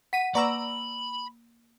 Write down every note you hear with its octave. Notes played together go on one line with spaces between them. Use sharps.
F#5 B6 D#7
A#3 B4 D5 F#5 A#5 B5 C#6 E6